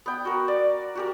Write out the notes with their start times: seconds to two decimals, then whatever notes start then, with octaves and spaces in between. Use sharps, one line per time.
0.06 B3 G5
0.25 F#4 A#4
0.48 D5
0.95 F#4 G4 A#4